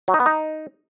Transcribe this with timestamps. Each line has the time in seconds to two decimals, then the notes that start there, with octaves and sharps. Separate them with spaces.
0.08 F#3
0.14 D#4
0.20 B3
0.26 D#4